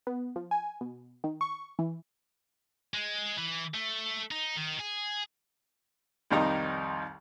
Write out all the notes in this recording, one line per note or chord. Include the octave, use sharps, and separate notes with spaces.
B3
F3
G#5
B2
D#3
C#6
E3
G#3
E3
A3
D#4
D#3
G#4
C2 F2 D#3 G3 D#4 A#5